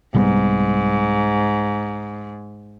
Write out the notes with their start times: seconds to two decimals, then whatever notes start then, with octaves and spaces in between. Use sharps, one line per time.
0.15 C2 G#2 G3 B3